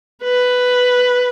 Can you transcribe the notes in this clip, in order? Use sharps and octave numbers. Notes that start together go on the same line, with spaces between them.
B4